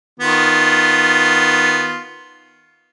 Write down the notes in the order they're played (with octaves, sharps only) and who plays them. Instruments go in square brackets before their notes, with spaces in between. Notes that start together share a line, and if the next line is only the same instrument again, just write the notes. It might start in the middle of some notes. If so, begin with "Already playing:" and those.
[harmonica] D#3 B3 F4